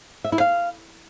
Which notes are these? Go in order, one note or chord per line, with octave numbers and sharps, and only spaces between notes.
E5
E4
F5